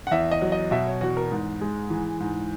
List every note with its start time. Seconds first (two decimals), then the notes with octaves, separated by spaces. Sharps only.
0.07 F#5
0.11 E2 E5
0.31 D#5
0.42 F#3
0.52 D#5
0.71 B2 E5
0.87 C#5
1.01 E2 F#4
1.17 A#4
1.32 G#2
1.61 G#3
1.90 E3
2.20 G#2